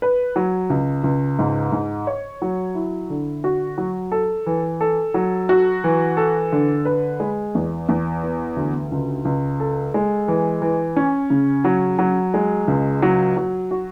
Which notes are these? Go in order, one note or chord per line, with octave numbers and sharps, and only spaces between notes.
B4
F#3
C#2
C#2
G#2
G#2
C#5
F#3
E4
D3
F#4
F#3
A4
E3
A4
F#3
F#4
E3
A4
D3
B4
G#3
E2
E2
B3
D2
C#2
C#2
A4
G#3
E3
E3
C#4
C#3
F#3
F#3
G#3
C#2
F#3
F#3
F#4